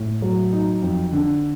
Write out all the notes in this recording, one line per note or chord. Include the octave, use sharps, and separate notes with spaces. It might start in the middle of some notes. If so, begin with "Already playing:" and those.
Already playing: A2
F#3
D#4
F2
D3